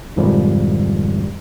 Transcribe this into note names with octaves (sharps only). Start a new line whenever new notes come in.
B1 F2 G#2 D#3 F3 G3